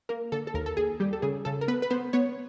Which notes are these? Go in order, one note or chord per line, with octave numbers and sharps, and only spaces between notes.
A#3 A#4
D3 A4
A4
D#2 A#4
A4
D#2 G#4
G3 G4
A4
C#3 G#4
C#3 A4
A#4
B3 B4
B4
B3 C5
B3 C#5